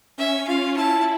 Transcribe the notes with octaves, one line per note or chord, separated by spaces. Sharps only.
C#4 E5
F4 F5
E4 A5